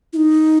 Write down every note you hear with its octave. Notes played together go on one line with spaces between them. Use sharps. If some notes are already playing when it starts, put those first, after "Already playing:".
E4
D#4